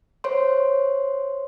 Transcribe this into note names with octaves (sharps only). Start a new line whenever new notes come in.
C5 C#5 C6